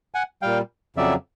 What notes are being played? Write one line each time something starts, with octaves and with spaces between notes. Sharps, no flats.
F#5 G#5
A#2 G3 F5 G5
F2 C#3 F#3 D5 E5